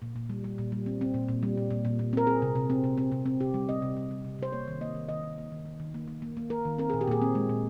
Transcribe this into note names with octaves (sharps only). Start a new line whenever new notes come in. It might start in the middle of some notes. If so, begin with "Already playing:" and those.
A#2
A#2
G3
G3
A#2
G3
C4
C4
A#2
A#2
G3
A#2
A#2
A#2
A#2
C4 A#4
C4 G#4
C3
C3
C4
C3
C4
C3
C4
C3 G4
G3
C4 D#5
C3
G3
G3
C3
C3 C5
A#3 C#5
D#3
A#3 D#5
D#3
D#3 D#5
D#3
A#3
D#3
D#3
D#3
A#3
A#3
A#3
A#3
A#3 A#4
D#3
C4 A#4
A#2 G#4
G4
A#2 G#4
C4
G#3
A#2